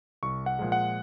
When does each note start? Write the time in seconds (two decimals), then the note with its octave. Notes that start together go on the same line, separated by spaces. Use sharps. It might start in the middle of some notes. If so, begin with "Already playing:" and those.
0.23 C2 C#6
0.46 F#5
0.59 A#2 F3 G#3
0.72 F#5